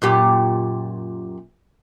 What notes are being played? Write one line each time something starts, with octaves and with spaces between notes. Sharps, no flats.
F#2 A#2 G4